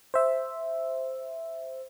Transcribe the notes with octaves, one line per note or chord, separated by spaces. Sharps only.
C5 E5